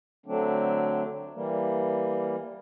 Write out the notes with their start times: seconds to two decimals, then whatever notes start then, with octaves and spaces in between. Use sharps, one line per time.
0.26 D3 F#3 A3 C4 D4
1.34 E3 G3 A#3